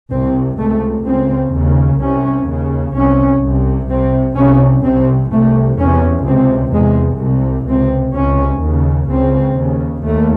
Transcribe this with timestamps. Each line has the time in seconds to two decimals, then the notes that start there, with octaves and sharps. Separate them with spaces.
0.11 C2 C3 C4
0.59 C#2 C3 A3
1.06 C#2 C#3 C4
1.53 D#2 C#3
2.01 C2 C3 C#4
2.48 D#2 C#3
2.95 C2 C3 C#4
3.43 C2 C3
3.90 C2 C3 C4
4.36 C2 C3 C#4
4.84 C2 C3 C4
5.31 C2 C3 A3
5.79 E2 C3 C#4
6.26 C#2 C3 C4
6.73 E2 C3 G#3
7.20 C2 C3
7.68 C#2 C3 C4
8.15 C#2 C3 C#4
8.63 D#2 C#3
9.10 C#2 C#3 C4
9.57 D#2 C#3
10.04 D#2 A3